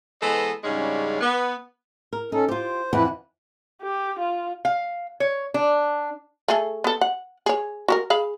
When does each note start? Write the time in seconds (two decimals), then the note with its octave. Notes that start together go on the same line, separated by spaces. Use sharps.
0.21 E3 G#3 B3 A4 C5 D#5
0.64 G#2 C#3 G3 G#3 C#4 D4
1.21 B3
2.13 A#4
2.32 C#4 D#4 A4
2.48 F4 G4 C5
2.93 F2 E3 E4 B4 F#5
3.82 G4
4.19 F4
4.65 F5
5.20 C#5
5.54 D4
6.48 A3 G#4 A4
6.84 B3 A4
7.01 F#5
7.46 G#4 C#5
7.88 F#4 G4 A#4
8.10 G#4 F5 B5